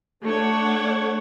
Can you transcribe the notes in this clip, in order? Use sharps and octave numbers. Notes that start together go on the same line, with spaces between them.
A3 D4 C#5 F#5